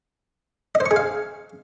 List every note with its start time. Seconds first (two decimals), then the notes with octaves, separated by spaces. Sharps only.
0.75 D#5
0.80 C5
0.86 C#6
0.91 G#4
0.96 F5